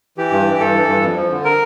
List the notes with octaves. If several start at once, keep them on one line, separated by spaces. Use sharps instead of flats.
E3 G4
G2
E3
G2 A4
E3
G2
F2
F3
D3
A#4